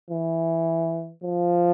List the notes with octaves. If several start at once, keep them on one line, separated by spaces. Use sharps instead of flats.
E3
F3